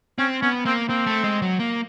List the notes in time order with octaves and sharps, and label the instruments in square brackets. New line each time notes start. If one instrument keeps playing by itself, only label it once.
[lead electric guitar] C4 [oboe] C#4
[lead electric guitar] B3 [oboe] C#4
[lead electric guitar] A#3 [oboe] C4
[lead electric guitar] A#3 [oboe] C4
[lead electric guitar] A3
G#3
F#3
A#3